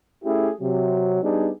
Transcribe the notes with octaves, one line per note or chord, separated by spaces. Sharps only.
A3 C#4 E4 G4 G#4
C3 F#3
G3 B3 D4 D#4 G#4